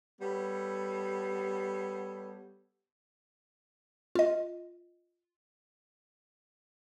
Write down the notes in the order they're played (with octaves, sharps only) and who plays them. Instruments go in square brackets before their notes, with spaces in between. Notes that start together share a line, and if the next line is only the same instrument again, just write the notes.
[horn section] G3 B3 A4 C#5
[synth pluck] F4 D#5